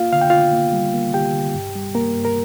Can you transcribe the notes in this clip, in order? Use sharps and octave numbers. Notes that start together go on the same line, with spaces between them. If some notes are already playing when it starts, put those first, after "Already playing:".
Already playing: A#3 F4 F5
D3 F5
G5
D3 F4 F5
A#3
G3
A#3
D3 G4 G5
D3
G2
G3
A#3 A#4
G2
A#4